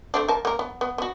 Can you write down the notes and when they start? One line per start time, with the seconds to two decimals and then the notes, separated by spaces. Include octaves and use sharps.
0.14 A3 C4 D4
0.28 A#4 A5
0.45 A#3 A#4
0.59 B3
0.81 B3
0.98 B3 F#4